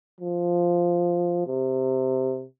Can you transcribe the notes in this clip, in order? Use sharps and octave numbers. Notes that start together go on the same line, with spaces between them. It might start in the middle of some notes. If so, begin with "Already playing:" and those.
F3
C3